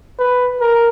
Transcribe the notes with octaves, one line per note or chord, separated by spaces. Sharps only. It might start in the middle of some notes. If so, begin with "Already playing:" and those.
B4
A#4